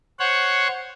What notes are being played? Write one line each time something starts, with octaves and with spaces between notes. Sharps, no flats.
C5 C#5 F#5